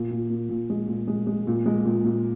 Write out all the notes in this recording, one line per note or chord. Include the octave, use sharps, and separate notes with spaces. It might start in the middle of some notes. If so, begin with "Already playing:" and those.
Already playing: A#2
A#2
A#2
A#2
G#3
A#2
G#3
G#3
A#2
G#3
A#2
A#2